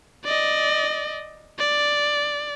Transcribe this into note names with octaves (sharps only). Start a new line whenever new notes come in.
D5 D#5
D5